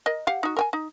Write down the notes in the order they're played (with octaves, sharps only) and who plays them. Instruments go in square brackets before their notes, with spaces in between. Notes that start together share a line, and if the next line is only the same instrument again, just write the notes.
[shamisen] A#4 D#5
G4 F5 F#5
D#4 F#4
A#4 G5 G#5
D#4